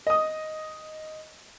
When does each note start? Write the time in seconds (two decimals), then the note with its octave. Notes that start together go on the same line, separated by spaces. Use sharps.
0.07 D#5 D#6